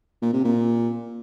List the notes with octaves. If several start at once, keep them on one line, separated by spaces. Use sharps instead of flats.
A#2
C3
A#2